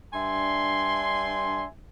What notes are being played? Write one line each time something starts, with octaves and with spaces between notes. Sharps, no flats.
G2 D4 E5 G#5 C6